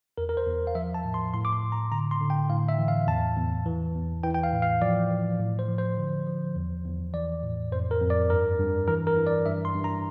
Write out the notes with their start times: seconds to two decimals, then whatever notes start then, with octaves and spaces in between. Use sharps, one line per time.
0.18 E2 A#4
0.29 A#4
0.37 C5
0.47 E2
0.67 F5
0.75 F3 E5
0.94 A5
1.05 A2
1.14 C6
1.34 A2 C6
1.45 D6
1.53 C6
1.63 A2
1.72 A#5
1.92 D3 A#5
2.11 C6
2.21 D3
2.30 G5
2.50 A2 F5
2.69 E5
2.78 E3
2.88 F5
3.07 E2 A5
3.37 E2
3.66 E3
3.95 E2
4.23 E3 G5
4.34 G5
4.43 F5
4.53 A2
4.62 F5
4.82 F3 D5
5.11 F3
5.40 A2
5.59 C5
5.68 F3
5.78 C5
5.98 D3
6.27 F3
6.56 E2
6.85 E2
7.14 E3 D5
7.43 A2
7.72 F2 C5
7.91 A#4
8.01 F2
8.10 D5
8.30 G2 A#4
8.59 G2
8.88 E3 A#4
9.07 A#4
9.17 E3
9.27 D5
9.46 G2 E5
9.65 C6
9.75 G2
9.84 A#5